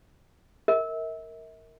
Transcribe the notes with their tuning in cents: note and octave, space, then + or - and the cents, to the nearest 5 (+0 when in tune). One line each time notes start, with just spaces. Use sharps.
A#4 -15 E5 -45